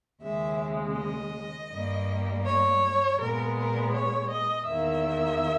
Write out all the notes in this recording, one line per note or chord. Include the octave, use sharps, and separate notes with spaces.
D#2 C#3 G#3 E5
D#5
G2 G3 A#3
C#5
A#2 G#3 B3 A#4
A#4
C#5
D#5
E2 D#3 A#3 E5